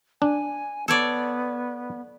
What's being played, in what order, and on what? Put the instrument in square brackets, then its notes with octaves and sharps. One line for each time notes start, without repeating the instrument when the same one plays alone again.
[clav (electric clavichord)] D4 [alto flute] G#5
[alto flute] B3 [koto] A4 C#5 D5